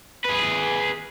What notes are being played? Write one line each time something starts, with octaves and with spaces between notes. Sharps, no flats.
G#4 B4